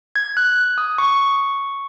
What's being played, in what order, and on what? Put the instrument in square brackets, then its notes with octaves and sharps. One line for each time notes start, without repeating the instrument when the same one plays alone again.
[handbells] G#6
F#6
D#6
C#6